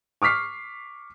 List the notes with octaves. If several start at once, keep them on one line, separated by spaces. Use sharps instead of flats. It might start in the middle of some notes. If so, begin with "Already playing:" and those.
C#6 D6 F6 B6 C7